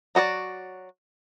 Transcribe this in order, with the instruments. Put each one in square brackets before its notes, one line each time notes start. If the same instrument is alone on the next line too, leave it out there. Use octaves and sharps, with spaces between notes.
[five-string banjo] F#3 F#4 G#4 D5